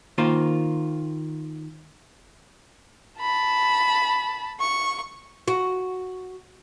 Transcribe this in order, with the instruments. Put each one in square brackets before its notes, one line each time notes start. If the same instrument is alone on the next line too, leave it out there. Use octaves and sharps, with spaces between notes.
[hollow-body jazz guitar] D#3 A#3 F4 C5
[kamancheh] A5 B5
C#6
[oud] F#4